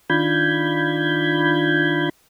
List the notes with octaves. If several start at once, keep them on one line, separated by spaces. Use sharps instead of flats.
D#3 D4 F4 B5 G6 G#6